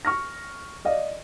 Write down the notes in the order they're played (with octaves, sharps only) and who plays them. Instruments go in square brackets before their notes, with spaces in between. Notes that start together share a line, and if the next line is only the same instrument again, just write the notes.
[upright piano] C#6 F6 A#6
D5 D#5 F5